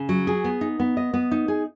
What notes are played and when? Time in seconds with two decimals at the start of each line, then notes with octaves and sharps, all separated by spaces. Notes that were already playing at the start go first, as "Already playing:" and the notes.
Already playing: C#3
0.09 F#3
0.27 G#4
0.44 B3
0.61 D#4
0.80 B3
0.97 D#5
1.14 B3
1.31 D#4
1.48 G#4